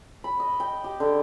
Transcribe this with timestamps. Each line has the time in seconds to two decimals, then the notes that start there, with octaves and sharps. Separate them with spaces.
0.24 B5
0.40 D#5
0.60 G5
0.84 G4
1.00 D3